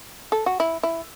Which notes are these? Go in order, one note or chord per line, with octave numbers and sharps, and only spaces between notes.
A4
F#4
E4
E4